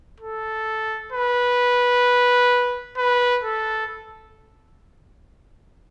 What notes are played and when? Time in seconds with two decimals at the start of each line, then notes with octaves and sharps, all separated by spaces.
0.20 A4
1.13 B4
2.97 B4
3.44 A4